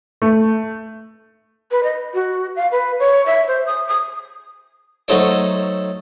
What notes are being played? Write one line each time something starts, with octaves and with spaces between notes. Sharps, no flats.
A3
B4
D#5
F#4
F5
B4
C#5
E5
C5
D#6
D#6
F#3 A3 D#4 A4 C5 C#5